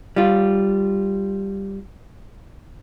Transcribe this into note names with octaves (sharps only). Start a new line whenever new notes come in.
G3 F4